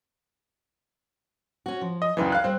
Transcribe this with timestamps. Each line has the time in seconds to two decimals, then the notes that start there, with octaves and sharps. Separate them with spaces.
1.66 C#4 F#4
1.81 F3
2.02 D#5
2.17 C#2 F#2 E3 D#4 B4 D5
2.32 F5 F#6
2.44 G3 C4 C5